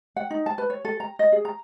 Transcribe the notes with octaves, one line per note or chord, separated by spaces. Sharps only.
F#5
D#4
A5
B4
C#5
A4
A#5
D#5
G#4
A#5